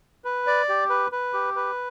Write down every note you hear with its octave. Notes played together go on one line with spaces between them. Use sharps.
B4
D5
G4
B4
B4
G4
B4